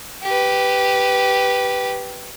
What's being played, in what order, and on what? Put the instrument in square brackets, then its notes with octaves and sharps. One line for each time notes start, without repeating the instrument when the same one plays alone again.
[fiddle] G4 B4